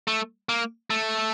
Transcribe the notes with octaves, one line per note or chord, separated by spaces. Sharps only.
A3
A#3
A3